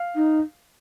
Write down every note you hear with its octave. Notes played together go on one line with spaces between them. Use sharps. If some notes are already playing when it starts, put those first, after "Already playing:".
Already playing: F5
D#4